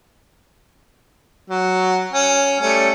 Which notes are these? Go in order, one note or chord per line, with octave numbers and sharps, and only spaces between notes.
F#3
C#4
G3 A3 C#4